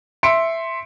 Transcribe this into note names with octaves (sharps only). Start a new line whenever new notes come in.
E5 C6 C#7 D7